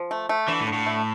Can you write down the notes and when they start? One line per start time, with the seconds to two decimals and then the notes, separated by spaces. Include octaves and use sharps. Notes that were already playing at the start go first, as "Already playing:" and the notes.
Already playing: F3
0.11 A3
0.29 A3
0.48 D3 E3
0.61 A2
0.67 D3
0.73 A2
0.86 A3